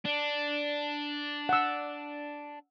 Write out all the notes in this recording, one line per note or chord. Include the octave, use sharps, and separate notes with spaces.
D4
F#5 E6